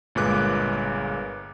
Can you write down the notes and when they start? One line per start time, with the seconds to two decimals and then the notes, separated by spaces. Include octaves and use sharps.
0.15 G1 A#2 G#3 B4 D6 F#6